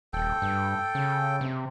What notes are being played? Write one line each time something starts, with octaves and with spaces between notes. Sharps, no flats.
D#1 A4 G5
G2
C#3
C3